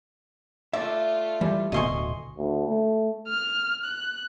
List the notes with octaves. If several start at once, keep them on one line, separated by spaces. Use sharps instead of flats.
A3 F4 D5 E5
E3 G3
D1 D2 B2 D#5 E5 G#5 C6 C#6
D2
A3
F6
F#6